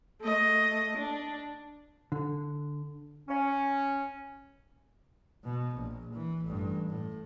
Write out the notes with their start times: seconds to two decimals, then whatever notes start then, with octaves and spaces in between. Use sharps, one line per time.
0.21 A3 D#5
0.98 D4
2.12 D3
3.29 C#4
5.44 B2
5.75 A#1
6.13 E3
6.44 A1 G2
6.89 A2